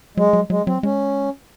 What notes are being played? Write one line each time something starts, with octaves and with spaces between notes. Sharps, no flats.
F#3 G#3
F#3
F#3 G#3
F#3 C4
G#3 C#4